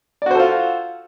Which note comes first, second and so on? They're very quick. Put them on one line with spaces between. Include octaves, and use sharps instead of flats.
D5 F#4 C5 A4 F4